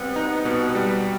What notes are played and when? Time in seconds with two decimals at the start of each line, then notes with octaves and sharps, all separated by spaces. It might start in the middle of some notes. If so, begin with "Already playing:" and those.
Already playing: B2 G3 B3 C4
0.16 D#4
0.45 B2
0.75 G3